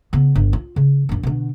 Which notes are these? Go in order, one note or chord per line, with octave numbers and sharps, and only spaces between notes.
C#3 B3
G1
F4
C#3
A#1 F#2
B2 D3